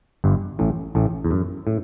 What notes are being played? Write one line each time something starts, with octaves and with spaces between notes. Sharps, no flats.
G1 G2
A1 A2
A1 A2
E2
F#2
A2